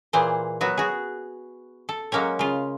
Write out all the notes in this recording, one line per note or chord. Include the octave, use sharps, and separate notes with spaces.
A#2 E3 G#4 C5
F#3 B3 F#4
F#4 G#4
A4
F#3 G#3 A#3 C#4 C#5
C#3 F4